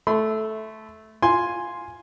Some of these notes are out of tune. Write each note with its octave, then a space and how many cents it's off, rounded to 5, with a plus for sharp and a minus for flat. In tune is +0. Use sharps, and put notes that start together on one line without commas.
A3 -10 C6 -45
F4 +10 G#5 +0 C6 +0